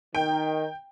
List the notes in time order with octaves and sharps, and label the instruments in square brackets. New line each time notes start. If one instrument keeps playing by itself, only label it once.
[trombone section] D#3 [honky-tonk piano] G5